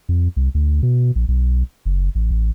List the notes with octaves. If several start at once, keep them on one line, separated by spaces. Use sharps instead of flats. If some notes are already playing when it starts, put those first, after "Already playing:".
F2
C2
D2
B2
A#1
B1
F#1
A1
A1